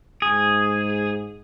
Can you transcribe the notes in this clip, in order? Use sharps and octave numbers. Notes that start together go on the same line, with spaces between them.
G#2 G#4